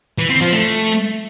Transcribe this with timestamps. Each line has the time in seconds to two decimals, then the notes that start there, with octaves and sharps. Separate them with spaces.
0.18 E3
0.30 C4
0.41 F3
0.52 A3